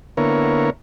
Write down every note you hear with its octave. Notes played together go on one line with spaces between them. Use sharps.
D3 A#3 B3 E4 A#4 C#5